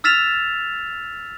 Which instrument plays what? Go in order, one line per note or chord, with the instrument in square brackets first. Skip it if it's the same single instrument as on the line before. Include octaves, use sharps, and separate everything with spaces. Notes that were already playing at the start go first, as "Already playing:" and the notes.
[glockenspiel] E6 F6 A6 B6 E7 F7